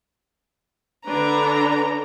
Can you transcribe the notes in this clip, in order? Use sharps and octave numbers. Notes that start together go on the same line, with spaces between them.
D3 D4 B4 A#5